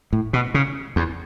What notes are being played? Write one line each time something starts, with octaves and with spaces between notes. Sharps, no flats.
A2
B2
C#3
E2